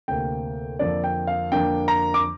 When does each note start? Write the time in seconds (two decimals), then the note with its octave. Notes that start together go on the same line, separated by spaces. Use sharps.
0.08 D2 C3 A#3 G5
0.79 F2 D3 A#3 D4 D5
1.04 G5
1.27 F5
1.52 F2 D3 A#3 D4 G5
1.88 A#5
2.14 D6